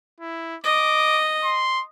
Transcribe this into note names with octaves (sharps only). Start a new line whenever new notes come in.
E4
D#5 D6
C6